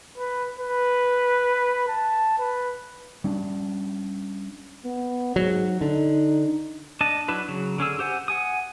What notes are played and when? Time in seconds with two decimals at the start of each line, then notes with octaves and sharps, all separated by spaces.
0.18 B4
0.60 B4
1.88 A5
2.39 B4
3.24 G3 C#4 D4
4.85 B3
5.36 G#2 F#3
5.81 D3 D#4
7.01 D4 D#5 A5
7.28 F#3 D4 E4 B4
7.48 C#3 F#3
7.78 D3 C#4 G#4 E6
7.99 G4 C5 F#5 G#5
8.28 F#5 G#5 D#6